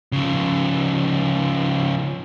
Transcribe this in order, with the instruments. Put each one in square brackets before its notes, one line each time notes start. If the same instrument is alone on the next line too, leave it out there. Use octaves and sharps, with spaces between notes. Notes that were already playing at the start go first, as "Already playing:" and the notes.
[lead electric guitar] C#3 F3